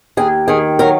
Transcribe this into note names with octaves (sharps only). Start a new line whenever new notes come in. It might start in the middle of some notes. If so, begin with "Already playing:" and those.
D#2 G#4
D#3 G#4
F#3 A#4